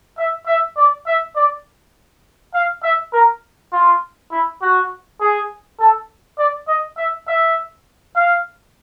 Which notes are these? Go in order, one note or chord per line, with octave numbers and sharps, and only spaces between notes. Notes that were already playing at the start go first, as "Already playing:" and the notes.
E5
E5
D5
E5
D5
F5
E5
A#4
F4
E4
F#4
G#4
A4
D5
D#5
E5
E5
F5